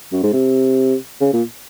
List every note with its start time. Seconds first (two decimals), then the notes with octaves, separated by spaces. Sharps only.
0.12 F#2
0.23 G#2
0.33 C3
1.20 C#3
1.33 A#2